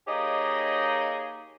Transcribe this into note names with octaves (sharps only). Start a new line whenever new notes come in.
A#3 D#4 G4 G#4 C#5 D#5